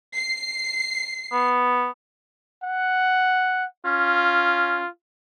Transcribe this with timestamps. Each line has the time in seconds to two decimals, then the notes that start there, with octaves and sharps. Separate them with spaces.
0.14 C7
1.33 B3
2.63 F#5
3.85 C#4 F4